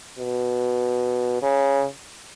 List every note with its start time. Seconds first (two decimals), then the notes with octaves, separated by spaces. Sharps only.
0.19 B2
1.42 C#3